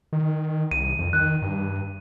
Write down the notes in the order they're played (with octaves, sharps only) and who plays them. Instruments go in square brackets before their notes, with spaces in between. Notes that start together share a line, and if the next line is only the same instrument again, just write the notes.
[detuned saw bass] D#3
[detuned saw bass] C2 [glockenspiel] D#7
[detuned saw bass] F2
[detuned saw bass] D#3 [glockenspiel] F#6
[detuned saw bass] G2